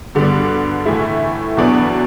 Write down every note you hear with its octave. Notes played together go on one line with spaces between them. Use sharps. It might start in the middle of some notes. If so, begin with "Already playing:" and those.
G2 D3 G3 B3 D4
A2 E3 A3 E4
E2 B2 F#3 B3 D4